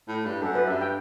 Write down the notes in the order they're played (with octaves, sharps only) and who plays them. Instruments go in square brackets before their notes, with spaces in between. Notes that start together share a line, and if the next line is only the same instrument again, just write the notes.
[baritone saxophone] A2
G2
[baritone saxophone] F#2 [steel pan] A4
[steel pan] B4
[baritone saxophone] G2 [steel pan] E5
[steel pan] G5